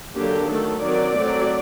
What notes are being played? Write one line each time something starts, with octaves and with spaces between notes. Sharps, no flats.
D3 F#3 A#3 D4 G4
D#3 F#3 A3 A4
D#3 F#3 C4 D5
F#3 A3 C4